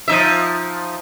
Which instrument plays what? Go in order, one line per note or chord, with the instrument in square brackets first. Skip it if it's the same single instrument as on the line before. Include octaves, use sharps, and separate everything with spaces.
[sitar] F3 D#4 E5